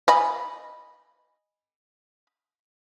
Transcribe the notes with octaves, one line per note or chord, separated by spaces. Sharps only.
D#5 G#5 B5